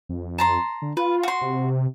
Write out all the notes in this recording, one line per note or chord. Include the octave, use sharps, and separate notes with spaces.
F2
A5 A#5 C6
D3
F4 B4
F#4 C6
C3